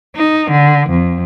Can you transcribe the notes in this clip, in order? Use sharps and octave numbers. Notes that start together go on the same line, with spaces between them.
D#4
D3
F2